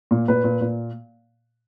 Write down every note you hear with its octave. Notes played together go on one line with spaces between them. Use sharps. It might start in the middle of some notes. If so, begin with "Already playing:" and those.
A#2
A#2 B4
A#2
A#2